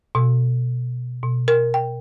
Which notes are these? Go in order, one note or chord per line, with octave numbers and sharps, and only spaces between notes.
B2
B2
A#4
G5